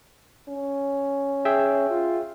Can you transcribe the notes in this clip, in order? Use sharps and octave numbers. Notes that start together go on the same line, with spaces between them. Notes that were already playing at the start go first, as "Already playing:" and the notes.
C#4
G#4 E5 G5
F4